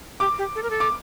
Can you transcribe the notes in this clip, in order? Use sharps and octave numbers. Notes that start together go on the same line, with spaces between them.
G4 D6
G4
A4
A#4
A4
D6